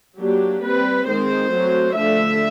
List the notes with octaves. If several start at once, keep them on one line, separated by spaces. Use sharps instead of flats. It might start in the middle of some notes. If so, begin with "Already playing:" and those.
F#3 A#3 D4 G4
G3 C4 B4
D#3 G#3 C4 C5
F#3 A3 C4
D3 F3 A3 E5